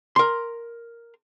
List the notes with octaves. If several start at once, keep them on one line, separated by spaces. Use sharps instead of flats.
A#4 C6